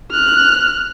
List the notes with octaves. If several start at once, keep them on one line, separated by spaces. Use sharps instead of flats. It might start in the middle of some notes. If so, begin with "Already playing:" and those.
F6 F#6